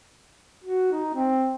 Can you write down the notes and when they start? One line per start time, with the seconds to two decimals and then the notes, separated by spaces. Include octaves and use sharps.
0.64 F#4
0.91 D#4
1.15 C4